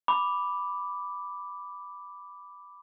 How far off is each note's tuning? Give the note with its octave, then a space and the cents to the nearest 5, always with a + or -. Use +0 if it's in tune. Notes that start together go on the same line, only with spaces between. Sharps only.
B5 +0 D6 +0